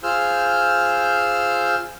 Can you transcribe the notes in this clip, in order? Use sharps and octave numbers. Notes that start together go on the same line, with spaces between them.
F4 G#4 C5 E6 F6 G6